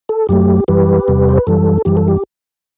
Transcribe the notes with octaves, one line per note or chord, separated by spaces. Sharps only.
A4
F#2 F#3 A3 G4
F#2 E3 G3 G4 B4
E2 C3 G3
C5
B4
F#2 E3 G3 A4
F#2 E3 G3 G4
A4
G4